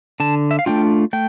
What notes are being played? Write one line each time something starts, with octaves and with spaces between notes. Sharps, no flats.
D3 A5
E5
F5
A3 D4 F4 G5
A3 G5